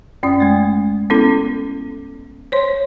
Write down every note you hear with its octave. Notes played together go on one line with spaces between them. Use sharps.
F#2 C#4 D5 D#6
G#3 A3
B3 C#4 E4 A4
C5 C#5 C6